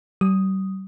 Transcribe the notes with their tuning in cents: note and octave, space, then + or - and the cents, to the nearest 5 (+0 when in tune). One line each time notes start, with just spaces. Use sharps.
G3 -40 D#6 +0